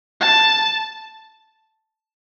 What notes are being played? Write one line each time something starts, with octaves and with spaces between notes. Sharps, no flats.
A5